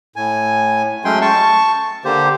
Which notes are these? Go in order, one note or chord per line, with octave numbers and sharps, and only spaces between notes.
A2 G#5
F#3 G#3 A3 C#4 G5 C6
A5 C#6
D3 A#3 G4 C5